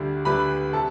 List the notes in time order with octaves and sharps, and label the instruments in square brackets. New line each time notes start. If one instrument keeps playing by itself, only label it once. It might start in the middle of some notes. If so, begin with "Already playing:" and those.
Already playing: [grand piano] D2 D3 G3
D2 D3 G3 B4 B5
C3 A4 A5